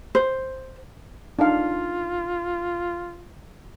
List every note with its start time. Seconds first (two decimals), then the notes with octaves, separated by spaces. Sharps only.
0.15 C5
1.39 D4 D#4 F4 F5